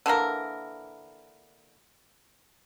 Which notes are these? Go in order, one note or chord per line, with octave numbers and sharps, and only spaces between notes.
D3 E3 A#3 A#4